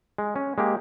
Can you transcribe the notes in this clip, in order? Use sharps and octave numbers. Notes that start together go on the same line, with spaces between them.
G#3
C#4
G#3 A#3 G4